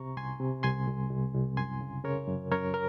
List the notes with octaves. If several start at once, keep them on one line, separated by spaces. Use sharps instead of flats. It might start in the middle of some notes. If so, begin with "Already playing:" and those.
Already playing: C2 C3 A#5 C#6
C2 G#5 C6
C3
C2 G#5 C6
C2
C2
C2
F#2 G#5 C6
C#3
C#3 A#4 C#5
F#2
F#2 A#4 C#5
A#4